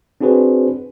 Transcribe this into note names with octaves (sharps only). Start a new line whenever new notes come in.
C4 D4 F#4 G#4 B4 C5